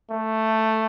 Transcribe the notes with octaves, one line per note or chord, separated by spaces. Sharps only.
A3